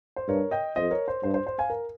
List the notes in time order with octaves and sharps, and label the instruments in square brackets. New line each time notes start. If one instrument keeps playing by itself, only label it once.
[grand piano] C5
[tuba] G2 [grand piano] A#4 C#5
[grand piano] D#5 G5
[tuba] F2 [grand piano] C5 D#5
[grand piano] A#4 C#5
C5
[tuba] G2 [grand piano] C5
[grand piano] C5
C5
F5 G#5
A#4